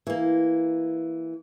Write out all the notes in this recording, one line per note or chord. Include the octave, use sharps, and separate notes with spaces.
E3 A#3